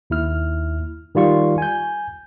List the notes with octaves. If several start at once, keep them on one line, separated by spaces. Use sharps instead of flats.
D#2 E4 F6
D#3 G3 F4 C#6
G#5 G6